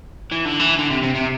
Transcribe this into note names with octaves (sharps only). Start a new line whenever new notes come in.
E3
D3
E3
D3
C3
C3
C3